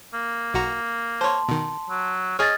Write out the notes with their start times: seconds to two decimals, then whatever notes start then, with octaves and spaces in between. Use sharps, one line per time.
0.14 A#3
0.54 B1 F#4 A#5
1.21 C5 C#5 A5 C6
1.48 B2 D#3
1.90 F#3
2.39 G#4 C#5 D#5 F6 G#6 A6